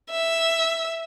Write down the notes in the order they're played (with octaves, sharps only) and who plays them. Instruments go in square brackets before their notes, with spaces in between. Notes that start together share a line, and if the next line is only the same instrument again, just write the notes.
[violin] E5